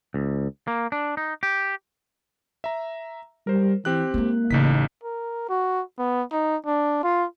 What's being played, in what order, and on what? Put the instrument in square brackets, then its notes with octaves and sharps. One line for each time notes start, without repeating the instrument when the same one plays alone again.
[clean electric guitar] C#2
A#3
D4
D#4
G4
[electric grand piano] E5 A#5
[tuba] G3 [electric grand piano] A#4 C5
[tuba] E3 [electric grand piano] C4 G4 F#6
[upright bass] G#3 D#4 [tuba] A#3
[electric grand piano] A1 D#4 B6 [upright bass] C#3
[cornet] A#4
F#4
B3
D#4
D4
F4